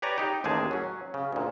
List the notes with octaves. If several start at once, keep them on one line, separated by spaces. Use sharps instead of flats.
G4 B4 C#5 D5 G#5 A#5
D#4 G4
A1 D#2 G#3 G#4 A5
F#3 C#4
C#3
D2 A#2